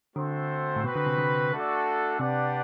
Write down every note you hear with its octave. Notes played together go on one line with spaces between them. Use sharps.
D3 A3 C4 F#4 C5
A2
B2 C4 F#4 B4
D3
C3
D3
A3 D4 F#4 A4 D5
C3 D4 G4 B4 D5 F#5